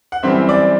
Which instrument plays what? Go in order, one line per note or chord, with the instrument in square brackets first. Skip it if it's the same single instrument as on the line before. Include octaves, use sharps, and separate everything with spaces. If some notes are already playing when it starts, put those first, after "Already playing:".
[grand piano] F#5
F#2 E3 G3 C4 E5
D5